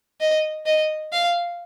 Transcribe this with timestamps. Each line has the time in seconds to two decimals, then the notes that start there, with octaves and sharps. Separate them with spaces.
0.21 D#5
0.66 D#5
1.13 F5